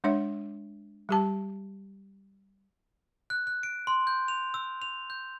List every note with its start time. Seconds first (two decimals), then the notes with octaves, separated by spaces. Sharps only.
0.04 G#3 D4 C#5 E5
1.09 G3 G4 A5
3.30 F#6
3.47 F#6
3.63 D7
3.87 C6
4.07 G6
4.28 F7
4.54 E6
4.82 F7
5.10 G6